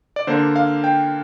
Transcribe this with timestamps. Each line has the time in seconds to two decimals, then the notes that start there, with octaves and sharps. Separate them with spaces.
0.16 D5
0.27 D3 A#3 D4 C5
0.56 F5
0.84 G5